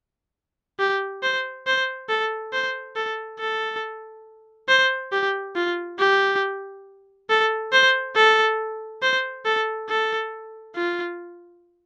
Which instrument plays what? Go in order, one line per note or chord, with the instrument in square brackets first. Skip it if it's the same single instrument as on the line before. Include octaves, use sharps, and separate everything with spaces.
[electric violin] G4
C5
C5
A4
C5
A4
A4
C5
G4
F4
G4
A4
C5
A4
C5
A4
A4
F4